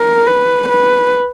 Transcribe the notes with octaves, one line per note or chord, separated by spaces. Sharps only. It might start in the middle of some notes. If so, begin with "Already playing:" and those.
Already playing: A#4
B4
B4